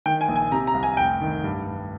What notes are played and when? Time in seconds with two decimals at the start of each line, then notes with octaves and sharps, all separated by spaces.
0.06 D#3 G5
0.21 G#5
0.28 A#1
0.36 G#5
0.52 C3 A#5
0.67 A#5
0.74 C2
0.83 G#5
0.97 F1 G5
1.21 D#3
1.44 G2
1.67 G2